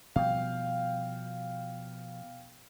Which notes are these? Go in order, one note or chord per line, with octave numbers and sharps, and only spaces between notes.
B2 F3 G3 F5 G5